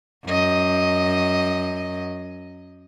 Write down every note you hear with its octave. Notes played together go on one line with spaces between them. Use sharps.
F#2 D#5